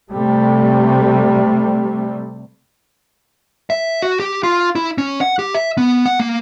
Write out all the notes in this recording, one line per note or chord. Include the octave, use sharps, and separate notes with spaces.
C3 G3 A3
E5
F#4
G4
F4
E4
C#4
F#5
G4
E5
B3
F#5
A#3